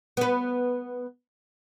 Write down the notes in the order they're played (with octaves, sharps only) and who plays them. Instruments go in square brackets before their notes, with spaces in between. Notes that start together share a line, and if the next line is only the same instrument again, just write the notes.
[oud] B3 B4